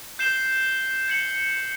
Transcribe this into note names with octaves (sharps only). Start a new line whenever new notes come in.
G6 C7 E7 G7
G#6 C#7 F#7